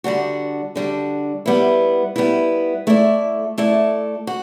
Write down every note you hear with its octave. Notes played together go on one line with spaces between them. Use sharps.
D3 G3 D4 F#4
D3 G3 D4 F#4
G3 B3 E4
G3 B3 E4
A3 E4 A4 D5
A3 E4 A4 D5
F#4